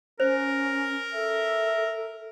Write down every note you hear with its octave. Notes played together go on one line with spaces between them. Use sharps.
C#4 A#4 C5
A4 E5